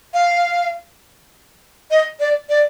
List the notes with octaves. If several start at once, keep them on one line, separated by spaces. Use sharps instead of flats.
F5
D#5
D5
D5